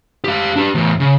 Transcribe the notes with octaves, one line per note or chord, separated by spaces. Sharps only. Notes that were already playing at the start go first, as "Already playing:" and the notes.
G4 F5
D4 G4
E2 A2
C#3